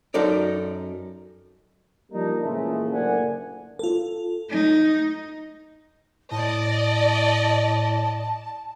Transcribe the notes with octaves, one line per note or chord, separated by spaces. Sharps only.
F#2 D#4 A4 D5
F3 G3 A#3 D4 D#4
A#2 C#3 E3 F3 G#3 A3
F#1 D2 A#3 D5 F#5 G#5
F4 A4
D#4
A2 D5 D#5 A5